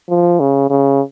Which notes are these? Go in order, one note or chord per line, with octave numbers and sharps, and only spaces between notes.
F3
C#3
C#3